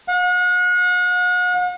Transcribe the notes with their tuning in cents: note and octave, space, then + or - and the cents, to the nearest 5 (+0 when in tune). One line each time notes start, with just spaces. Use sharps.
F#5 -40